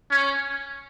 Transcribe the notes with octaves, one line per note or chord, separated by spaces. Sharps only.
C#4